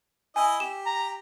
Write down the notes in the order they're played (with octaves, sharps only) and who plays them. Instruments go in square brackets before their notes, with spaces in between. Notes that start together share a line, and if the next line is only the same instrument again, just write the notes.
[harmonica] E4 D#5 [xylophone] G#5
[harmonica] G4 [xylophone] E7
[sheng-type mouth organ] A#5